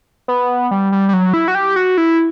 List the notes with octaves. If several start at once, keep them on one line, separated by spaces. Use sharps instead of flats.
B3
G3
G3
G3
F#3
E4
F#4
G4
F#4
E4